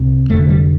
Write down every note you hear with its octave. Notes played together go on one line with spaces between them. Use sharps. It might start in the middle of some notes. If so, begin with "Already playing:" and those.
Already playing: C2 C3
F1 F2 D3 A3
G3